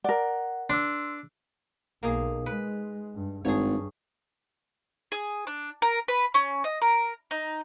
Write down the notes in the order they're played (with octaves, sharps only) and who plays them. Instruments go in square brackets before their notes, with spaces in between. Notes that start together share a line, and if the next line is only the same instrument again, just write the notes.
[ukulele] A#4 D5 [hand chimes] F#5
[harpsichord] D4 [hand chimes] C6 E6
[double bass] B1 [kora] A#3 D#4 G#4
[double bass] G#3 [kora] B4
[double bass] G2
[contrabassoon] G#1 [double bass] G2 [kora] G#4 C#5
[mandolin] G#4
D4
A#4
B4
C#4
D#5
A#4
D#4